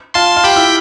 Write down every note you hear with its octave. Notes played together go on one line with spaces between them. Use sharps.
F4 A5 C6
F4
G4 G5 B5
E4